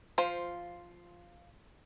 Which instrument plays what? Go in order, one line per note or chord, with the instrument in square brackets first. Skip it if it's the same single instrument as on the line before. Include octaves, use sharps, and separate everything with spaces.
[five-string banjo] F3 F4 C5